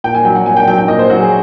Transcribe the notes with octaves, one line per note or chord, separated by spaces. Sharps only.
A#2 G5
G#5
F#3 G5
F#5
A#2 G#5
G5
F#3 G5
G5
A#2 D#5
C5
F#3 F#4
G#4